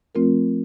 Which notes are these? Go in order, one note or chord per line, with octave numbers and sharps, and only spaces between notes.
F3 A3 C4 F4 A#4